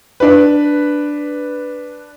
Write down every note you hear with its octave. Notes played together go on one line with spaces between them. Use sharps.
D4 B4